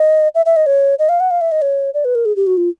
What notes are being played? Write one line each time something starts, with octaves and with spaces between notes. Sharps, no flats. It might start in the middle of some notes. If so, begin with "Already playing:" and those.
Already playing: D#5
E5
E5
D#5
C#5
D#5
F5
F#5
F5
E5
D#5
C#5
D5
B4
A#4
G#4
G4
F#4
F4